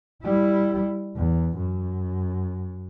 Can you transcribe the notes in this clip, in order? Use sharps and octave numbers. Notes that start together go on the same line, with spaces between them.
G3 E4
E2
F#2